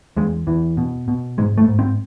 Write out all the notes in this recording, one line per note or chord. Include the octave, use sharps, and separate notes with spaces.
E2 G#3
E2 E3
B2
B2
G#2 G#3
A3
G#2
C4